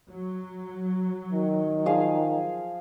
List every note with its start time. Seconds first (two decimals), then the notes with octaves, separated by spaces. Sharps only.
0.10 F#3
1.33 D#3
1.86 F3 G#4 F5